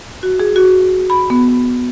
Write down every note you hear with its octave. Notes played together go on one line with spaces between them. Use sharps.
F#4
G#4
F#4
B5
B3